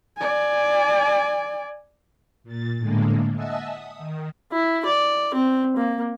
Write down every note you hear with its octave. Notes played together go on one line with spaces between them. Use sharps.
D5 G#5
A#2 A6
A2 D3 G#3 A#3
D#5 E5 F#5 G#5 A5 E6
D#6
D#3
E4
D5
C4
A#3